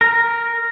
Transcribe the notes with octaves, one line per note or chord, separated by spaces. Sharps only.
A#4